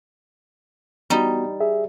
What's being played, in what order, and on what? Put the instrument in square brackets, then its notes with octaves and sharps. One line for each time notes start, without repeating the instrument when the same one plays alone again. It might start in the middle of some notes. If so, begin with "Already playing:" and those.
[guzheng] G3 D#4 [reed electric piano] B3 F#4
[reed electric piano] G#4 E5